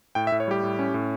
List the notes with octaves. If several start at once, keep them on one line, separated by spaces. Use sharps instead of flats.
A2 G5
E5
A2
C#5
G3 G4
A2
C#4
A2